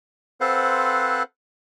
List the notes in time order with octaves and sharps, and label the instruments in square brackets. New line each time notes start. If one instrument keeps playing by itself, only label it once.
[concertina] C4 A4 B4 C5 F5 F#5